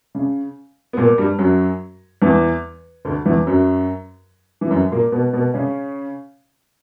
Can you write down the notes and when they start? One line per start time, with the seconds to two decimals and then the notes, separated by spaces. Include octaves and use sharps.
0.15 C#3
0.93 B3
0.97 A#2 A#3
1.18 G2 G3
1.39 F#2 F#3
2.22 E2 E3
3.05 D2 D3
3.25 E2 E3
3.46 F#2 F#3
4.61 E3
4.70 F#2 F#3
4.91 A#2 A#3
5.12 B2 B3
5.33 B2 B3
5.54 C#3 C#4